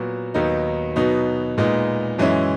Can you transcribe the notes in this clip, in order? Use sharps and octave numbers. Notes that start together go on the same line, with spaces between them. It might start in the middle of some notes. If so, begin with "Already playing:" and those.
Already playing: A#2 F#3 B3 F#4
D#2 D#3 F#3 B3 D#4
B2 F#3 B3 D#4
A#2 G#3 B3 D#4
F#2 E3 G#3 C#4 E4